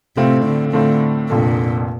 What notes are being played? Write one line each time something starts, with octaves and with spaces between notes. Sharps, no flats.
A2 C3 A3 C4 F4
D3
A2 D3 A3 C4 F4
F1 F2 A#2 D3